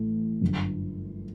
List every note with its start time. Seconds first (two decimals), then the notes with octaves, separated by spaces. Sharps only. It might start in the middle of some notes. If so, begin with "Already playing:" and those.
Already playing: A1 A2 A3
0.41 G1 F#2 D3